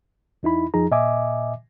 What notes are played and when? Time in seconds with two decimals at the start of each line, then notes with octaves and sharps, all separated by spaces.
0.43 E2 D#4 E4 B5
0.74 F2 F3 D#4 G#4 A#5
0.91 A#2 D#5 E5 G#5 D6